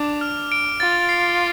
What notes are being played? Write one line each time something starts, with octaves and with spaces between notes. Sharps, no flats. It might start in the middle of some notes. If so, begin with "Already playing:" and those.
Already playing: D4 D6 F7
F6
D7
F4 A6
C7